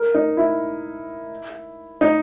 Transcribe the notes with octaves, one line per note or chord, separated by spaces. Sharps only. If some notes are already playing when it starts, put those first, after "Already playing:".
Already playing: A#4
D#4
E4
D#4